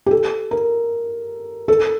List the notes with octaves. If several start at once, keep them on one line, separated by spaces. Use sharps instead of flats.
G4
A4
A#4
A4